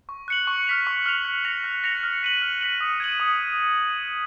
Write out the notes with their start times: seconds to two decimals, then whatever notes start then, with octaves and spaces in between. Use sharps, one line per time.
0.09 C#6
0.28 F#6 C#7 F#7
0.47 C#6
0.67 F6 B6 F7
0.87 C#6
1.06 F6 B6 F7
1.25 F#6
1.44 A#6 C#7 F7
1.64 F#6
1.84 A#6 C#7 F7
2.03 F6
2.23 B6 D#7 F#7
2.42 F6
2.61 B6 D#7 F#7
2.81 D#6
3.00 G#6 D#7 F#7
3.20 D#6